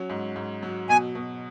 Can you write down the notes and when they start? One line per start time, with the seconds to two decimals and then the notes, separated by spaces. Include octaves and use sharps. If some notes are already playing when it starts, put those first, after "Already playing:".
Already playing: F#3 C#4
0.10 G#2
0.36 G#2
0.63 F#3
0.89 B2 G#5
1.15 B2